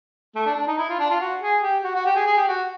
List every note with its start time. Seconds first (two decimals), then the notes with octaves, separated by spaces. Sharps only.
0.35 A3
0.46 D4
0.56 D4
0.67 D#4
0.78 E4
0.89 F4
0.99 D4
1.10 F4
1.20 F#4
1.42 G#4
1.63 G4
1.84 F#4
1.95 F#4
2.05 G4
2.16 G#4
2.26 G#4
2.37 G4
2.48 F#4